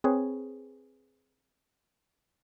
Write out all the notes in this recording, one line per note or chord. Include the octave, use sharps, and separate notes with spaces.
C4 G#4 B4 C#5